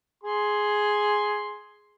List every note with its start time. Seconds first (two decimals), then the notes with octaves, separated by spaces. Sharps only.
0.24 G#4 C6